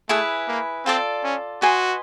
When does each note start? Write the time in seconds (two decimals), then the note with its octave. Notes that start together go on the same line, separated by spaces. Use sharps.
0.09 A3 E4 G#4 B4
0.48 A#3
0.86 C4 F4 A4 D5
1.24 C#4
1.62 F#4 B4 D#5 G#5 C6